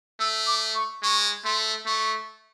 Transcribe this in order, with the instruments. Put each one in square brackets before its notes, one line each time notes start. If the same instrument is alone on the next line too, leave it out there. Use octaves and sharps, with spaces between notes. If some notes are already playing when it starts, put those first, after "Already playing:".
[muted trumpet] A3 [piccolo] E6
[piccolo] D6
C#6
[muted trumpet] G#3 [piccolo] C#6
[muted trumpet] A3 [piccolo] C6
[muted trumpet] A3 [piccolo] C#6